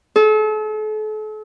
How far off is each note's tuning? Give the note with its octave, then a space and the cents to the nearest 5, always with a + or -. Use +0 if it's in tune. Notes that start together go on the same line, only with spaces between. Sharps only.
A4 -40